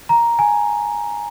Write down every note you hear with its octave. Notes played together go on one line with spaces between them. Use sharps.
A#5
G#5